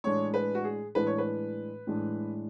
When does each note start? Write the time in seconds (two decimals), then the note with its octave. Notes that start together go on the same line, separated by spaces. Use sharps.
0.04 A2 E3 G#3 D4 C#5
0.34 B4
0.55 F#4
0.64 G#4
0.95 A2 E3 G#3 D4 B4
1.07 C#5
1.18 B4
1.87 A2 E3 G#3 D4